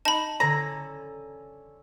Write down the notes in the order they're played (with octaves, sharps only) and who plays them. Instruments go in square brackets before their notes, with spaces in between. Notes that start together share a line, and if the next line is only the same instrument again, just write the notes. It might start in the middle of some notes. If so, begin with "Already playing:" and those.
[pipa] D#4 [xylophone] A5 B5
[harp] D3 C#4 A4 [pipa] A#5